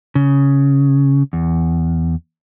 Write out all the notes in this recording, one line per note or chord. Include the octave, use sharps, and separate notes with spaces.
C#3
E2